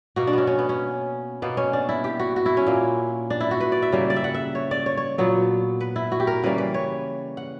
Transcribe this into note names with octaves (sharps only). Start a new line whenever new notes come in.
B2 A#3 F#4
D4
B3 C#4
C#4
B3
C#4
B2 A#3 B3
C#4
D4
E4
G4
F#4
F#4
E4
C#4
A#2 A#3
D4
E4
F#4
B4
D5
E5
C#3 G3 A#3
D5
E5
F#5
E5
C#5
D5
C#5
C#5
A#2 F#3 B3
B4
E4
F#4
G4
A#4
C#3 E3 G3 A#3 B4
B4
C#5
F#5